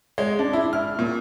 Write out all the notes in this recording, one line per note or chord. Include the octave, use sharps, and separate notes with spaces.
G#3
D4
E4
F6
A#2